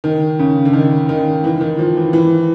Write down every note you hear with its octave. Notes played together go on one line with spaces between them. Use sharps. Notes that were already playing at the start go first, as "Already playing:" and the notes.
D#3
C#3
D3
D#3
D#3
E3
D#3
F3
E3
E3